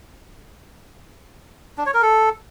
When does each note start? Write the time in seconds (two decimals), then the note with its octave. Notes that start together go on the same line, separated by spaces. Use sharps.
1.78 D4
1.86 C#5
1.94 A#4
2.02 A4